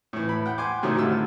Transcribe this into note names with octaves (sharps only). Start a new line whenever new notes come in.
A2 E3
B5
F#5 G5
G#5 C6 D6
A2 C3 D#3 F#3 G3 A3
A2 D3 F4 E6